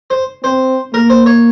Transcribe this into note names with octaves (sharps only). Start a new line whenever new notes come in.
C5
C4 C5
A#3 A#4
C5
C#5